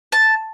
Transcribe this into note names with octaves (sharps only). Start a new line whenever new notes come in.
A5